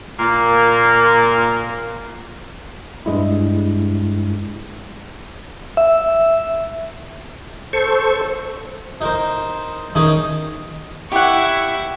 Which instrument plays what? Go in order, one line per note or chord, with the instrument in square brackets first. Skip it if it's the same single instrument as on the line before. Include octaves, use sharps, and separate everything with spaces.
[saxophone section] A#2 A#3
[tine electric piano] G2 G#3 E4
[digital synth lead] E5
[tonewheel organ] A4 C5 C#6
[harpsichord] D#4 A#4 C5
D#3 C#4 D#4 G#4
[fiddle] E4 C#6 [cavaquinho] G4 F#5